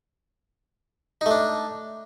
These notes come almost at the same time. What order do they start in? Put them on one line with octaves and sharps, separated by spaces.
D#4 A3 D4